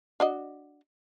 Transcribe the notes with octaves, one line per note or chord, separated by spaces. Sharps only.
D4 F#4 D#5